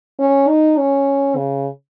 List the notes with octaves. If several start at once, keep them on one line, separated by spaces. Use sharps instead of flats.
C#4
D#4
C#4
C#3